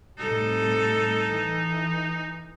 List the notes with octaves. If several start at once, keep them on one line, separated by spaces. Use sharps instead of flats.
A2 C3 G3 D#4 A4
E3